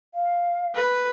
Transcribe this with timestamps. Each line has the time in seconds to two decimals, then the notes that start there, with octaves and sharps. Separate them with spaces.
0.14 F5
0.75 B4